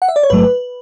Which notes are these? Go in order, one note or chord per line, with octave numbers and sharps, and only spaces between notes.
F#5
E5
D5
C#5
A1 G#2 F#3 A3 B4